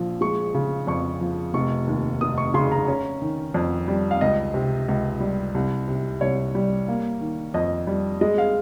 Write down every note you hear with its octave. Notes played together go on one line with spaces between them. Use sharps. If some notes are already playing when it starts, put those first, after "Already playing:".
Already playing: A#1 F3
G#3 C#6
C#3
F2 C#6
F3
F1 C#6
D#2
F1 D#6
C#6
C#3 C6
A#5
C#4
D#3
F2
G3
F5
C#2 D#5
C3
C#2
G3
C2
C3
C2 C#5
G3
A#3
D#3
F2 D#5
G3
G#3 D#5
F5